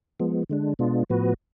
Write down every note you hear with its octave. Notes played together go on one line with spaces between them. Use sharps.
F3 G#3 B3
D3 G#3 D4
B2 G#3 B3 D4 F4
A2 F3 B3 F#4 B4